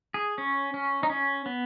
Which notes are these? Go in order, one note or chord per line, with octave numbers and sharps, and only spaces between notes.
G#4
C#4
C#4
D#4
C#4
B3